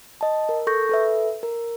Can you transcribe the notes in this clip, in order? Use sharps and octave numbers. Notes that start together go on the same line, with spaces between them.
D#5 A5
A#4
A4 C#6 G6 A#6
A4 B4 E5
A#4